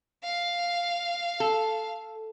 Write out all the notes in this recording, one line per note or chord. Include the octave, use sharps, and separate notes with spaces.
F5
A4